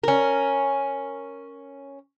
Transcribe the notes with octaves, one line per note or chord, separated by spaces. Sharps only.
C#4 A#4